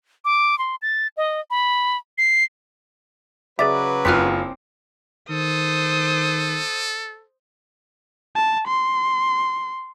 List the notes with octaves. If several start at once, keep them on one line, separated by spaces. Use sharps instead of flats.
D6
C6
A6
D#5
B5
C7
C#3 F#3 G#4 B4 D5 E5 D6
F#1 C4 F4 F6 F#6 B6
D#3 A4 C5 D#6
A5
C6